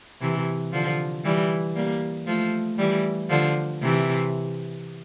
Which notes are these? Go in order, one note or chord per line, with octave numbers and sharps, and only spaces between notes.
C3 E3
D3 F3
E3 G3
G3 A#3
F3 A3
E3 G3
D3 F3
C3 E3